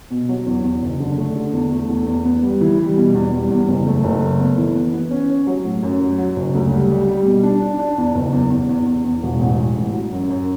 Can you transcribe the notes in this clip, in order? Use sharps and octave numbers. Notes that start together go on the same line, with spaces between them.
B2
F#3
E2
E2
F#1
D3
A3
D3
E2
A3
E2
E2
B3
G3
E3
G3
B2
E2
G3
E2
F#1
A3
F#1
A3
B3
E3
B3
B3
C#4
C#4
F#3
A2
F#2
F#3
F#3
F#1
D2
G3
G3
G3
B2
D4
D4
D4
E2
F#1
E2
E2
E2
E2
E2
E1
A1
A1
A1
F#3
F#2
F#2